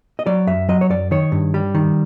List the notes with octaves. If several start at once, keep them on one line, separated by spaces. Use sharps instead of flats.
D#5
F#3 D5
F#2 E5
F#3 D#5
C#5
F#2 D5
D#3 C#5
G2
G3
D#3